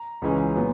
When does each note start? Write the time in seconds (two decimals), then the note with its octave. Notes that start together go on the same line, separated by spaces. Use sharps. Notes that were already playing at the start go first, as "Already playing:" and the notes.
Already playing: A#5
0.22 C#2 C#3 E3 G#3 C#4
0.55 A#2 F#3 B3